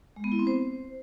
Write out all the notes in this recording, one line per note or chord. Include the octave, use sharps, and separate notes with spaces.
G#3
B3
E4
C4
C5